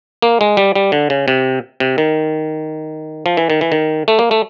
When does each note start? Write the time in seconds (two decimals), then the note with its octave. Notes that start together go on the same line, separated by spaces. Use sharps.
0.22 A#3
0.41 G#3
0.57 G3
0.75 G3
0.92 D3
1.10 C#3
1.28 C3
1.80 C3
1.98 D#3
3.26 F3
3.37 E3
3.50 D#3
3.61 E3
3.72 D#3
4.08 A3
4.19 A#3
4.31 A3